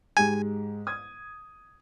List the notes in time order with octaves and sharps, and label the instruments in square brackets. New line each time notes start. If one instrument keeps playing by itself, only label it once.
[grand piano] G#2 G#3 G4 [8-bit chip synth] G#5
[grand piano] D#6 G#6